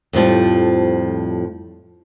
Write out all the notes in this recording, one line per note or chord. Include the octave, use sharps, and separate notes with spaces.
F2 A2 F3 G3